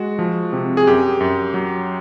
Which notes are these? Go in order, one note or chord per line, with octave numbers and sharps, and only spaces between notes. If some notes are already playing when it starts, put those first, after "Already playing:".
Already playing: G#3 F#4
F3
C3
G#4
F#2 G4
F#2
F#3